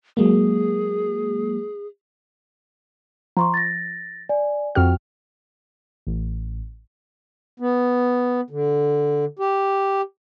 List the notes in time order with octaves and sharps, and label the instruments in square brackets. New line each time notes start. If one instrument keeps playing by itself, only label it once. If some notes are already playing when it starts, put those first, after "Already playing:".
[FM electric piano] F#3 G#3 A#3 [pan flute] G#4
[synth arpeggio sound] F3 [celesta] A#5 C6 C#6
[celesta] A6 A#6
D5 G#5
[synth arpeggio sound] F2 F#4 F6 [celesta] G5
[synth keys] A1
[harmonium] B3
D3
G4